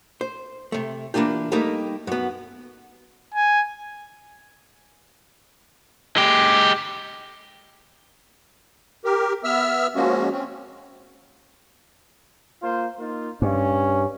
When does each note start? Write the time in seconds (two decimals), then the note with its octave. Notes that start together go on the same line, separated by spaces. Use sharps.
0.21 C5
0.72 C3 A3
1.14 E3 A#3 D4 F4 G4
1.52 G3 A3 A#3 D#4 G4
2.07 F#2 B3
3.34 G#5
6.17 G#3 G4
9.05 G4 A#4
9.44 B3 E5 E6 F6
9.96 F3 G#3 A#3 C#4 F#4
10.32 C4 C#4
12.62 A#3 F4 C5
12.99 A#3 D#4 F4
13.42 G2 C#4